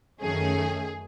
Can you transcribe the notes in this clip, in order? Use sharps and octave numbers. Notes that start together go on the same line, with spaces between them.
F#2 D#3 A3 C#4 G#4